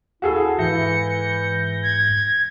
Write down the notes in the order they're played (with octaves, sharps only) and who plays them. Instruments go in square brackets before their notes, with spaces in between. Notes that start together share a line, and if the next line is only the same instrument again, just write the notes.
[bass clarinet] E4 [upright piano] F#4 G#4 A4
[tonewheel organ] G#2 G6 A#6 [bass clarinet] E3 [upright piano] E4 [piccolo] C#7
[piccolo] G#6